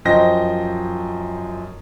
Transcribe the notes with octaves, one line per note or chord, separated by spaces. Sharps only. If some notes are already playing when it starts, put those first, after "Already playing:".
F#2 F3 C5 D#5 G5 A#6